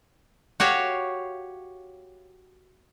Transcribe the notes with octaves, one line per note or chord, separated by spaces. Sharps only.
F#4 G4 C#5 F5